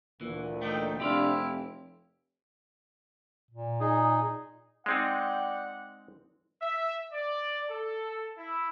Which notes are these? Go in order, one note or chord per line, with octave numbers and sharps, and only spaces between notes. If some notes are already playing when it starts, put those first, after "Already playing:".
D2 A#2 E3
E3 A3 D#4 G5
F1 C3 D4 E4 G4 D5 F5 C6
C4
A#2
D#4 G#4
G#3 C4 D#4 D5 F#5 G5
E5
D5
A4
E4